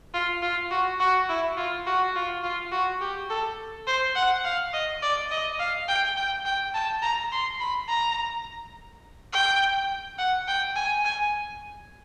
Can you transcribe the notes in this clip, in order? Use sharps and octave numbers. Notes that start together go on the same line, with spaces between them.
F4
F4
F#4
F#4
E4
F4
F#4
F4
F4
F#4
G4
A4
C5
F#5
F5
D#5
D5
D#5
F5
G5
G5
G5
A5
A#5
C6
B5
A#5
G5
F#5
G5
G#5
G#5